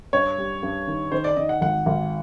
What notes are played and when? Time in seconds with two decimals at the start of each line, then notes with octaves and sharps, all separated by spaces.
0.13 G2 C#5
0.38 G3
0.63 G2
0.87 D#3
1.12 D#3 C5
1.24 D5
1.36 D#3 D#5
1.49 F#5
1.61 G#1 F#5
1.86 G#1